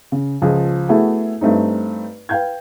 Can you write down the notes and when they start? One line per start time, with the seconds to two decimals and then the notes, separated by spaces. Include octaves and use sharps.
0.12 C#3
0.42 C#2 F3 G#4
0.89 A3 B3 E4 F#4 G#4
1.41 G2 A3 C4 D#4
2.29 B4 F5 G5 G6 G#6